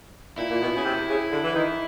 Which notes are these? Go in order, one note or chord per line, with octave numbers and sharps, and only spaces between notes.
A#2 E4
A#2
B2
C#3
C3
C#3
D3
E3
D#3